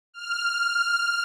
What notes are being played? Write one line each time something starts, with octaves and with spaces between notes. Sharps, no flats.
F6